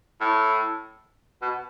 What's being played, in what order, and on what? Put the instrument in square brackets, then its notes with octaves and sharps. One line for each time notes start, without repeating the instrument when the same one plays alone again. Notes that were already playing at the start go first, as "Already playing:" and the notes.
[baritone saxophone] A2
B2